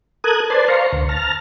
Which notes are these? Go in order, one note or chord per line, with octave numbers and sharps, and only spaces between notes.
A4 A#4 D#6 F#6 G#6
B4 C5 D5 A5 C6
C5 F5 A#5 C6 C#6
D2
A5 A#5 F6